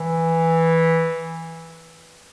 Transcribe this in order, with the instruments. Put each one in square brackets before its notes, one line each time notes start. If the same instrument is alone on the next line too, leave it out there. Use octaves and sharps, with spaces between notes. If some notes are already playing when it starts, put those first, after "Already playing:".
Already playing: [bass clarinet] E3